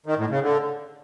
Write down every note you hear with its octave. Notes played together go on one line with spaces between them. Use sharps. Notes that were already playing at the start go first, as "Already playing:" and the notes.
D#3
A2
C#3
D3